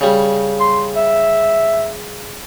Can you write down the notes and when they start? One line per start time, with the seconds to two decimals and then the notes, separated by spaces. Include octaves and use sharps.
0.01 C#3 G3
0.60 C6
0.96 E5